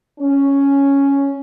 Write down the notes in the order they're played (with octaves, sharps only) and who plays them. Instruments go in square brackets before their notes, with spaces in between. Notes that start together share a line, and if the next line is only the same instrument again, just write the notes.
[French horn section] C#4